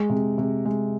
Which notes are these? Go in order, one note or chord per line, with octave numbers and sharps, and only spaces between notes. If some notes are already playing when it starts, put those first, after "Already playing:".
Already playing: G#3
C3
C3
G#3